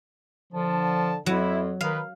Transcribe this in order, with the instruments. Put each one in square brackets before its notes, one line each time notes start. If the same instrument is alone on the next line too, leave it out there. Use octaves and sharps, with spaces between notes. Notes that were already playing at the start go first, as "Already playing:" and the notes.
[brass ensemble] D3 A5 [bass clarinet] F3
[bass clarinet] F2 [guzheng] F#3 [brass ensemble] E4
[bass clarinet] D#3 [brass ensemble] A#4 B4 [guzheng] F5